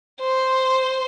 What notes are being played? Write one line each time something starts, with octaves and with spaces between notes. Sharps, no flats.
C5